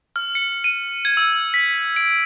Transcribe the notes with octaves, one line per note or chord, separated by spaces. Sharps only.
F6
C#7
D#7
G#6
E6
B6
D7